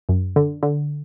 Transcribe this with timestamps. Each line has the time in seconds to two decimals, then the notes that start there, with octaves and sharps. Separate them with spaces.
0.09 F#2
0.36 D3
0.63 D3